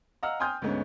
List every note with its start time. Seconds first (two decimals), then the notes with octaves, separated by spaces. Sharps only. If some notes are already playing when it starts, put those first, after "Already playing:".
0.23 D#5 F5 F#5 A#5 E6 F6
0.40 G5 G#5 C6 D#6 F6 G6
0.62 D2 G#2 G#3 B3 C#4